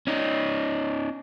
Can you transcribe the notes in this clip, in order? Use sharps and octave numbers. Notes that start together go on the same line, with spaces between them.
C#4 D#4